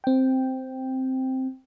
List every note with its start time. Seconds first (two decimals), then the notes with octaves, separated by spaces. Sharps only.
0.04 C4 G5